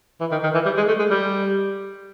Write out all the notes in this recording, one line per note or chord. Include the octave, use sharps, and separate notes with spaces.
E3
D#3
D#3
E3
G3
G#3
A3
G#3
G3